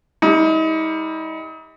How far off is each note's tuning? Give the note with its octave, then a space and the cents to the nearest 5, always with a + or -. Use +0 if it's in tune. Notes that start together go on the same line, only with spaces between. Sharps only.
G3 +30 D#4 +40